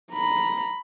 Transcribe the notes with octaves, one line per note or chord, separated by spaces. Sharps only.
A#5 B5